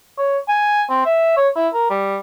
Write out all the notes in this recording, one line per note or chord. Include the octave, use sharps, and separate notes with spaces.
C#5
G#5
C4
E5
C#5
E4
A#4
G3